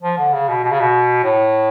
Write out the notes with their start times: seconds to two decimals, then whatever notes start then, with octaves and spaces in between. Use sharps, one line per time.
0.02 F3
0.18 D3
0.33 C#3
0.48 B2
0.64 B2
0.71 C#3
0.80 B2
1.24 A2